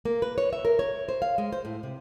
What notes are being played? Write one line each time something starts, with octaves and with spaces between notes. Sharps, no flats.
A#3
B4
C#5
E5
A#4
C#5
C5
F5
G#3
C5
A2
C3